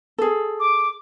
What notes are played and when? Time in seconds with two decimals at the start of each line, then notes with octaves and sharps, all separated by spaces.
0.18 G#4 A4
0.60 D6